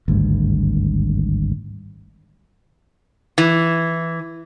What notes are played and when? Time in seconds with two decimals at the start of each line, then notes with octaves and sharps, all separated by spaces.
0.08 G#1 D2 G2
3.38 E3